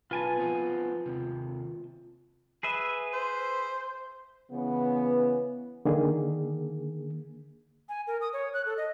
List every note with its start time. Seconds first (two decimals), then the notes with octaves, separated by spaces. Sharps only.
0.11 B1 F4 B4 G#5 A5
0.37 F3 B3 C4
1.06 D#2 C3
2.63 G#4 B4 E5
3.14 C5
4.50 C#3 E3 B3
5.85 D3 D#3 A#3 G#4
7.89 G#5
8.07 A#4
8.21 D#6
8.33 C#5
8.54 F#6
8.65 A4
8.77 D#5